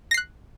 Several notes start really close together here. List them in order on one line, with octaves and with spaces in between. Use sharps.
A#6 C7 F#6